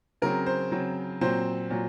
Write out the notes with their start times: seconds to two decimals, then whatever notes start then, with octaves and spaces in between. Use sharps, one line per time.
0.22 C#3 F#3 C4 A#4
0.46 C5
0.72 C#3 F#3 C4
1.21 A#2 F#3 C4 C5
1.71 A#2 F#3